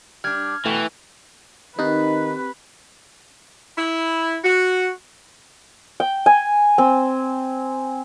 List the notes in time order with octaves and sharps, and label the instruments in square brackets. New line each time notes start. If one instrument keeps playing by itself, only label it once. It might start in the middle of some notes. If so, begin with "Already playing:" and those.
[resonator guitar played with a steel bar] G3 D4 [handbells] F6 G#6
[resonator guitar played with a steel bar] B2 [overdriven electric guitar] E3 [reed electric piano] A3 G5 C#6
[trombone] D#3 [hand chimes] C4 G4 F#6 [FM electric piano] D#4 [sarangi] B4
[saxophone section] E4
F#4
[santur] G5
G#5
C4